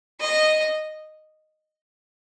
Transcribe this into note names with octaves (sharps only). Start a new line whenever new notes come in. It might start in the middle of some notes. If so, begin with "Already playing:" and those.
D#5